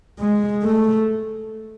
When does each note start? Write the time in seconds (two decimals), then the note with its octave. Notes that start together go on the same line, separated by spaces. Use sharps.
0.19 G#3
0.63 A3